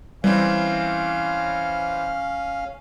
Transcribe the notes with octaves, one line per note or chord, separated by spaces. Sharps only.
E3 G3 C4 C#4 F5